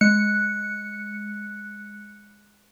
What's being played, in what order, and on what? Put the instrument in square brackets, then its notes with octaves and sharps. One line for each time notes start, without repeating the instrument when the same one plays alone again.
[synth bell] G#3 F#6 C#7